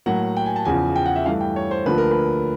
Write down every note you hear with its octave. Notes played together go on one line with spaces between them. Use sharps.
A2 F#3 A#3 F#5
G5
G#5
A5
E2 C#3 F3 G#5
G5
F#5
E5
G2 E3 A3 F5
G5
C#5
C5
D2 D3 F3 A#3 B4
A#4
B4